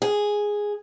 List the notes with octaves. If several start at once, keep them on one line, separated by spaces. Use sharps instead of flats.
G#4